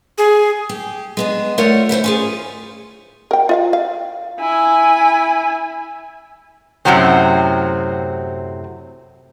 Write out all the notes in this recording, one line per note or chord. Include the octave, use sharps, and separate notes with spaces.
G#4
G4
G#3 B3 D4
A3 F4 A#4 C#5 D5 F#5
B3 E4 C5 C#5
C#4 F4 G#4
A#4 G5
F4 E5 F5
F5
E4 G#5
F#2 A2 C3 F#3 C4